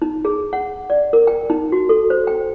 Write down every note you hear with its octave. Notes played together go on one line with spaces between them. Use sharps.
D#4
G#4
F#5
D5
A#4
G5
D#4
F#4
A4
C5
G5